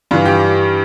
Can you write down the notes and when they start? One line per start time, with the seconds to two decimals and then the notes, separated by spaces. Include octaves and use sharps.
0.11 G2 E3 F4
0.26 G4